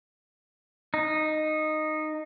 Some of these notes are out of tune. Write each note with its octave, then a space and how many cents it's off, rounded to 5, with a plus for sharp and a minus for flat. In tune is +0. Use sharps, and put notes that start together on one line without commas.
D#4 -10